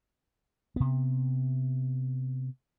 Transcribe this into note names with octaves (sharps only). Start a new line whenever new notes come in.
C3 B3